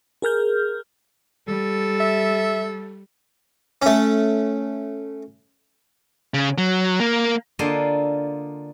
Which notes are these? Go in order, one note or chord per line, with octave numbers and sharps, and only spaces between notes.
G#4 A#4 F6 G6
G3 A4
E5
A3 C#4
C#3
F#3
A#3
D3 A#3 D4 F4 D#5 C6